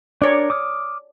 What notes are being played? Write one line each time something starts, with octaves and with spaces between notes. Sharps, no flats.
D4 A#4 C#5 D5
D6 D#6 F6